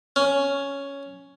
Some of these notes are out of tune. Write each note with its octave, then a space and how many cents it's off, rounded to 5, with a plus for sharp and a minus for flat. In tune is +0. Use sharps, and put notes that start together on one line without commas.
C#4 +5